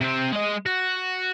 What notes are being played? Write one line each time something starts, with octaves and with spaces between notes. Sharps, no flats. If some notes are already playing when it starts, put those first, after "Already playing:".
C3 C4
G#3 D#5
F#4